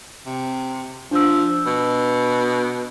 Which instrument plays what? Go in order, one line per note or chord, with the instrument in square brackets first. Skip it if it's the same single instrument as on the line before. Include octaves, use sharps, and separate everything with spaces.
[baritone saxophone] C3
[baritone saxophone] F3 [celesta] D4 E6
[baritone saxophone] B2